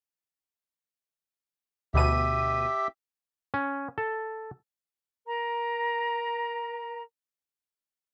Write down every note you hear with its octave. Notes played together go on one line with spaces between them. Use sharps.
D2 B2 G4 E5 D#7
C#4
A4
A#4 A#5